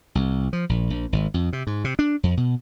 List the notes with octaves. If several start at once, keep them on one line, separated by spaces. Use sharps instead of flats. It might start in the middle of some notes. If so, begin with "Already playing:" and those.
C2
F3
A#1
A#1
G#1
F2
C3
G#2
C3
D4
F2
B2